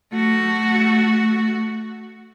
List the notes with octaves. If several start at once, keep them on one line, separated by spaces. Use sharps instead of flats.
A3 F#4